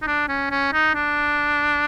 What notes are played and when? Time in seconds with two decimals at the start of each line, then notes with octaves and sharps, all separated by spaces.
0.02 D#4
0.07 D4
0.28 C#4
0.51 C#4
0.73 D#4
0.95 D4